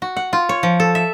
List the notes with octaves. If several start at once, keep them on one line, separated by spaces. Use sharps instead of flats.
F#4
F#5
F4
C#5
F3
A4
E5